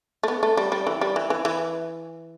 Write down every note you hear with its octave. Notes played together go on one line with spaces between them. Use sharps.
A3
B3
A3
G3
G3
E3
G3
E3
E3
E3